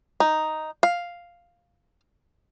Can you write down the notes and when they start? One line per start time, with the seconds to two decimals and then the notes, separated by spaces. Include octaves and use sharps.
0.20 D#4
0.83 F5